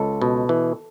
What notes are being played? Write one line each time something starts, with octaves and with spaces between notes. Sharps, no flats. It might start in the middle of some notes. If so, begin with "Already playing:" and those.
Already playing: C#2 A4
B2
E3